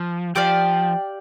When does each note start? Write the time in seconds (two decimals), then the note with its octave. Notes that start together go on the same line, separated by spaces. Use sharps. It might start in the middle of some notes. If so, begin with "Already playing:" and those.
Already playing: F3
0.36 F3 G4 D5 F5